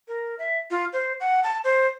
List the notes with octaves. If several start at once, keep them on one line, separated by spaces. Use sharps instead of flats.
A#4
E5
F4
C5
F#5
A5
C5